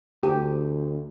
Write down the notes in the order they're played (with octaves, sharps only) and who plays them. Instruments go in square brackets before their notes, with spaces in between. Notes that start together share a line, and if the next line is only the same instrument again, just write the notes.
[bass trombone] D2 [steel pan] G4